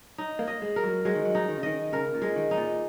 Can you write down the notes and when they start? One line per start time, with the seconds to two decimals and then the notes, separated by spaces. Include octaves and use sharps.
0.18 D#4
0.39 A#3
0.47 D#5
0.62 G#3
0.76 A#4
0.83 F#3
1.05 F#3 G#3
1.15 D#3
1.25 F#3
1.35 D#4
1.48 D#3
1.57 C#3
1.63 D#3 D#5
1.92 C#3 A#4
2.14 A#2
2.22 G#3
2.36 D#3
2.51 D#4
2.57 A#2